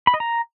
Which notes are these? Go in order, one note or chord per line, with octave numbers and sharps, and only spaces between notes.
B5
D#5
A#5